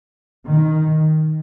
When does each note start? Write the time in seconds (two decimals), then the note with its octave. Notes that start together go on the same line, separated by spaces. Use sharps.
0.47 D#3